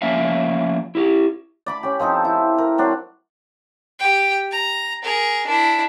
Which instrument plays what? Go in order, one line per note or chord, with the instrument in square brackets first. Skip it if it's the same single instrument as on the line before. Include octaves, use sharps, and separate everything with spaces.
[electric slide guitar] F3 A#3 C#4 D5 E5 F5
E4 G4
[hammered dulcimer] D5 B5 D6
C#4 G4
F3 C4 D#4 A4
E4
A#4
F#3 C4 D4
[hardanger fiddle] G4 G5
A#5
G#4 A#4
D4 E4